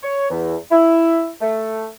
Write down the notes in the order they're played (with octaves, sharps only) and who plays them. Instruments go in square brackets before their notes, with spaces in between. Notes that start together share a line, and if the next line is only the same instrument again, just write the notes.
[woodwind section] C#5
E2
E4
A3